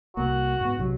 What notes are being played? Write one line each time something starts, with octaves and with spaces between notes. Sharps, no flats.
C2 A#3 F#4
G#2 B3
B1 C3 F#3